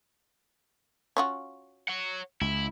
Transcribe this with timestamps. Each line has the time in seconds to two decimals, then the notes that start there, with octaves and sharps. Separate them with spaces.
1.17 C#4 F4 F#4
1.88 C#5 F#5
2.41 C#2 E4